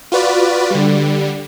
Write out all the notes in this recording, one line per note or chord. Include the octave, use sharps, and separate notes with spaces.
F4 F#4 B4 D5
D3 G3